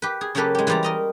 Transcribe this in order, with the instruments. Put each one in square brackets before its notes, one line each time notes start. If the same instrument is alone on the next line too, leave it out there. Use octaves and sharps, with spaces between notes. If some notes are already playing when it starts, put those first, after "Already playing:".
[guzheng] G4 B4
G#4
C#3 F#3 A#3 G4 A4 B4
G#3 G4
E3 G3 F4 G4 D5 A#5
A#4 D#5 A#5